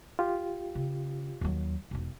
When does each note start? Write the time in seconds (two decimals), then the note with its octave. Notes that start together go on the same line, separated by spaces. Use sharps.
0.19 F4 G4
0.75 C#3
1.41 D#2 F#3
1.91 E1 D#4